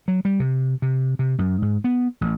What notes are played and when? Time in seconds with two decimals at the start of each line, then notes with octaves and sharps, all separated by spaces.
0.08 F#3
0.25 G3
0.40 C3
0.82 C3
1.19 C3
1.38 F#2
1.62 G#2
1.84 B3
2.21 A1